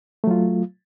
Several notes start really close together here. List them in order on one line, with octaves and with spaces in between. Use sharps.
A3 F#3 F4